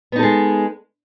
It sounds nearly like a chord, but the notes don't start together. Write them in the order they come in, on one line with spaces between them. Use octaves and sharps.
B3 D#4 A4 G#3